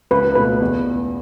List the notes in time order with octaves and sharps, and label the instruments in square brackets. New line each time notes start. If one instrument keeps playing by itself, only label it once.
[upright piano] C#2 [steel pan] B4
[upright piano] B2 A3 [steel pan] B4
[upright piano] E2